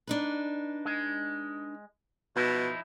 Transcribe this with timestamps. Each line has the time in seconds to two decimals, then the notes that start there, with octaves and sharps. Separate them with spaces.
0.07 D4 D#4 B4
0.85 G#3
2.36 B2 F3 D#4 E4